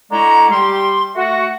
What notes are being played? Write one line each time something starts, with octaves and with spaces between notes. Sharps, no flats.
D3 G#3 E4 F#4 D5 A#5
G3 G4 C6
A3 F#4